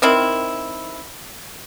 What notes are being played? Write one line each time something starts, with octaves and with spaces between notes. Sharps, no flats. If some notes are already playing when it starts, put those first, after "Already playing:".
D#3 C4 E4